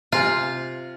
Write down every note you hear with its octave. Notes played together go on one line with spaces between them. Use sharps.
C3 F4 G#5